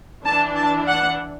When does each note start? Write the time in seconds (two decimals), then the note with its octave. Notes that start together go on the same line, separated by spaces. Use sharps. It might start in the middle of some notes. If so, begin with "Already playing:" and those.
0.24 E3 D4 A5
0.56 A5
0.87 F#5